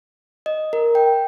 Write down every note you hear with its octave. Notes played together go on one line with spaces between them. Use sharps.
D#5
A#4
G5